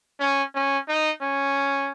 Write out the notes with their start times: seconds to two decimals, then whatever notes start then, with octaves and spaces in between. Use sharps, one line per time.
0.20 C#4
0.54 C#4
0.88 D#4
1.22 C#4